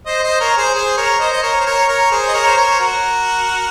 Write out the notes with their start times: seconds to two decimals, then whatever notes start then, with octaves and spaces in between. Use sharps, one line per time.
0.06 C5 D#5
0.23 C5 D#5
0.40 A#4 C#5
0.57 G#4 C5
0.75 G#4 C5
0.97 A#4 C#5
1.20 C5 D#5
1.33 D#5
1.43 A#4 C#5
1.61 C5
1.66 A#4 C#5
1.89 A#4 C#5
2.11 G#4 C5
2.28 D#5
2.33 A#4 C#5
2.46 C5
2.56 A#4 C#5
2.71 C5
2.80 F#4 A#4